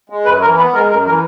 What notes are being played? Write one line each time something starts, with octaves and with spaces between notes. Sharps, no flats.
G#3
F#2 B4
E3 A#4
B3 B4
G#3 A#4
F#2 A#4
E3 A#4